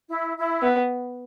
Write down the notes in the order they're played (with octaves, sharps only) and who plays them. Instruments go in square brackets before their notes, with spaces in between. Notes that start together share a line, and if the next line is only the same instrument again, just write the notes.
[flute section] E4
E4
[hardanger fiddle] B3